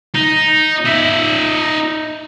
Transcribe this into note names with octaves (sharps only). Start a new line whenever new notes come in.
D#4
D#4 E5